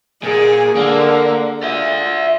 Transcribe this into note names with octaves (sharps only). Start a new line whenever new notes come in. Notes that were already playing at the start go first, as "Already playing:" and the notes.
A#2 G#4
D3 A#3
F4 D5 E5